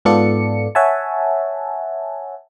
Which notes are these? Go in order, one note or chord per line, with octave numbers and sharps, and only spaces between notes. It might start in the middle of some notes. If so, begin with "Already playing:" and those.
G#2 B3 F4 A4 D5 C#7
C#5 E5 F#5 G#5 A5